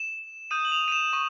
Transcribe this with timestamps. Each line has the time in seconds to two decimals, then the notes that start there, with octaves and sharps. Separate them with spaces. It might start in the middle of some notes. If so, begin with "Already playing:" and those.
Already playing: E7
0.51 D#6 G6 D#7
0.65 F#7
0.72 F7
0.88 D#7
0.92 E7
1.13 C#6 D#7